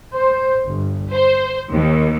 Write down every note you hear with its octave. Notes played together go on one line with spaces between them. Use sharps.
C5
G1
C5
D#2